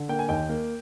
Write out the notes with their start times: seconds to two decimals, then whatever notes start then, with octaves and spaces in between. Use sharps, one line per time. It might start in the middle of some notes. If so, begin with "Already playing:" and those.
Already playing: D3
0.09 A#3 G5
0.19 G#5
0.29 D#2 D#5 G5
0.49 A#3